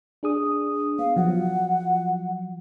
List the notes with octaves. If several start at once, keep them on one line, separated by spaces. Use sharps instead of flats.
D4 G#4 D#6
B3 F5
F3 F#3 F#5